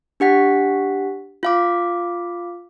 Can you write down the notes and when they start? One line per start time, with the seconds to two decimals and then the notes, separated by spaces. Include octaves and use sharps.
0.20 D4 G4 F#5 B6
1.43 F4 F5 D6